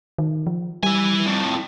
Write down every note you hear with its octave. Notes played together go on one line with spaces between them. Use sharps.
D#3
F3
G3 E4 G#5
F2 A2